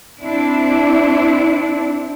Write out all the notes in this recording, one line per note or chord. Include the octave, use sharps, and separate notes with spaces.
C4 D4 E4